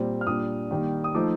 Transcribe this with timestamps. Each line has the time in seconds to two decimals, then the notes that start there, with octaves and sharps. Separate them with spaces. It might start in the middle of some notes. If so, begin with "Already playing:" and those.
Already playing: A#2 G3 C4
0.21 F6
0.27 A#2 G3 D4 D#6
0.71 D#3 G3 A#3 D#4
1.04 D#6
1.15 F3 A3 D#4 D6